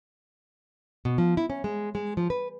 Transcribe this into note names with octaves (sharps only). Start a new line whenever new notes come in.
B2
F3
E4
C#4
G#3
G#3
F3
B4